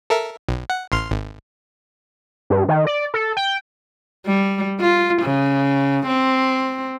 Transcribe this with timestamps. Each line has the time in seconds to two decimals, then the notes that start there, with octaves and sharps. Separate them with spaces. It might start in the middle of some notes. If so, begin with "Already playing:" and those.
0.10 A4 A#4 E5
0.48 B1
0.70 F#5
0.92 A1 C6 F6
1.11 G#1
2.50 G2
2.69 D#3
2.87 D5
3.14 A4
3.37 G5
4.26 G3
4.80 F4
5.23 C#3
6.07 C4